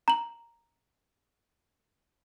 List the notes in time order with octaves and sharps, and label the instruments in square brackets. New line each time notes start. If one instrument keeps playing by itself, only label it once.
[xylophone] A#5 F#7